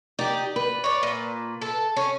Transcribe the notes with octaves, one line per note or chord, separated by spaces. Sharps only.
D#4 G4 D5
B4
C#5 D5
A#2
A4
C#4